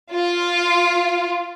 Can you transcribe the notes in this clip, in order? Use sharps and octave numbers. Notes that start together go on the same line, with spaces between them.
F4